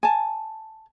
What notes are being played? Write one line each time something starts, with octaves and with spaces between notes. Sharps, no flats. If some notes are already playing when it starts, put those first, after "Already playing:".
G#5 A5